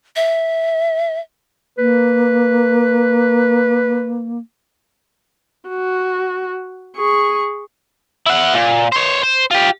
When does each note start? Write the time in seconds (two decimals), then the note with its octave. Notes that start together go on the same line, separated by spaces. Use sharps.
0.16 E5
1.78 A#3 B4
5.69 F#4
6.97 G#4 C#6
8.26 E4 F#5
8.54 A#2
8.92 C5 C#5
9.23 C5
9.51 F4 G4